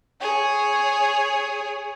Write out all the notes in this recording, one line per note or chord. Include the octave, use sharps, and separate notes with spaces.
G#4 C#5